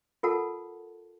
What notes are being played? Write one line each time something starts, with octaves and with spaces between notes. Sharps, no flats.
F4 A4 A#4 F#5 A5